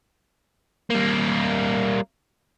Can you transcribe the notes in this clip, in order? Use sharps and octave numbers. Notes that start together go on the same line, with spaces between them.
G3 A#3